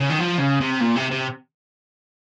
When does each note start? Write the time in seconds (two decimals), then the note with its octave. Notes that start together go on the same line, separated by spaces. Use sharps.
0.01 C#3
0.10 D#3
0.20 F3
0.39 C#3
0.60 C3
0.80 A#2
0.95 C3
1.11 C3